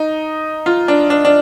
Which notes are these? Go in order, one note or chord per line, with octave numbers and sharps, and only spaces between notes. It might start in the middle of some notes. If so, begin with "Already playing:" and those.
Already playing: D#4
F4
D4
D4
D4